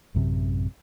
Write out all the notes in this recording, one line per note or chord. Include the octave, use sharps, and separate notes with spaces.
A1 F#2 C3